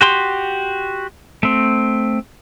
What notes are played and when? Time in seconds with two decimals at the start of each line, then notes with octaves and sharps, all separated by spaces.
0.01 F#4 G4 C6
1.43 A3 C4